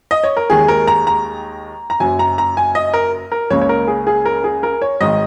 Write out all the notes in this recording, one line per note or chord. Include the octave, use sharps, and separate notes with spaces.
D#5
C#5
A#4
D#2 D#3 G#3 G#4
A#4
A#5
A#5
A#5
F#1 F#2 F#3 G#5
A#5
A#5
G#5
D#5
A#4
A#4
C#2 C#3 A#3 C#5
C#5
A#4
G#4
G#4
A#4
G#4
A#4
C#5
G#1 G#2 D#3 D#5